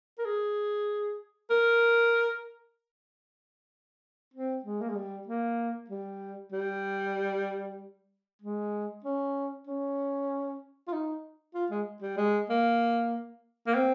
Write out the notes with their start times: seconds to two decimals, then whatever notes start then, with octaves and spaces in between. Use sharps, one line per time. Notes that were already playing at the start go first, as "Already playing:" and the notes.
0.18 A#4
0.25 G#4
1.50 A#4
4.34 C4
4.64 G#3
4.81 A#3
4.89 G#3
4.95 G3
5.27 A#3
5.90 G3
6.52 G3
8.42 G#3
9.04 C#4
9.67 C#4
10.87 F4
10.93 D#4
11.54 F4
11.70 G#3
12.02 G3
12.17 G#3
12.50 A#3
13.67 A#3
13.75 C4